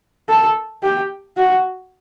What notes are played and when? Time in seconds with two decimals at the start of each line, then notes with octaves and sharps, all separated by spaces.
0.29 A4
0.83 G4
1.37 F#4